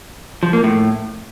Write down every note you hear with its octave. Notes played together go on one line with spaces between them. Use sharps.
F3
A#3
A2